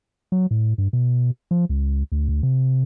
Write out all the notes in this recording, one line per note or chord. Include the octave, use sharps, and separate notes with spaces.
F#3
A2
G2
B2
F3
C#2
D2
D2
C3